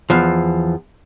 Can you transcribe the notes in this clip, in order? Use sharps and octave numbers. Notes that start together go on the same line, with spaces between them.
E2 F3